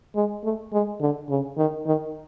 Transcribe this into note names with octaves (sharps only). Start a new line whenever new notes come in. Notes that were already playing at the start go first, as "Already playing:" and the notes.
G#3
A3
G#3
D3
C#3
D#3
D#3